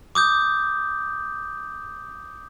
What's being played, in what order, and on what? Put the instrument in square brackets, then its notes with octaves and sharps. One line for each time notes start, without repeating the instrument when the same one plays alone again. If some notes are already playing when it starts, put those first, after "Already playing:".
[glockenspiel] D6 D#6 G6